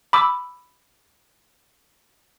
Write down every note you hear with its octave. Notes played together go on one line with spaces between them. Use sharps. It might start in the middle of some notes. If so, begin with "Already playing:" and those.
B5 D6 E6